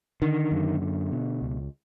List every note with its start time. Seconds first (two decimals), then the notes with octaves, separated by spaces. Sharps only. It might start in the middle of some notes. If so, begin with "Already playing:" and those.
0.22 D3 D#3
0.51 F#2
0.81 D3
1.12 B2
1.41 C#2